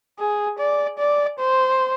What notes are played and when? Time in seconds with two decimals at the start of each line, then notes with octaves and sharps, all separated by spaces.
0.19 G#4
0.59 D5
0.98 D5
1.39 C5